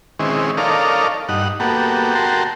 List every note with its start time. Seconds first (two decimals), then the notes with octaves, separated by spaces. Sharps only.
0.19 D#3 G#3 C4 C#4 E4
0.57 D#4 A4 A#4 C#5 D5 F5
1.29 G2 D#4 F#5
1.60 A#3 B3 F#4 G4 A4
2.15 F#4 A#4 G5 A5 C6